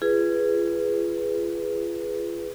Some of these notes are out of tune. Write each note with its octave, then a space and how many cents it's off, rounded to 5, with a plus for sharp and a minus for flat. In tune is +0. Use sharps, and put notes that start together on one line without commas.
F4 -35 G#4 +0 B4 +0